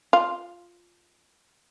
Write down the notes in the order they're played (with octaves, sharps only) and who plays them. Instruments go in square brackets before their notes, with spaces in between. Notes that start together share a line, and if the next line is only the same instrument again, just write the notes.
[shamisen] F4